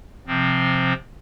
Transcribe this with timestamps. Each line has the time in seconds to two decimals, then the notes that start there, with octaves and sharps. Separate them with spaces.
0.27 C3 F3 C4